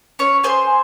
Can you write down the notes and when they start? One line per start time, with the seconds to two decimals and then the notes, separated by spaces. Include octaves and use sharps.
0.19 C#4 C#5
0.43 G#4 C5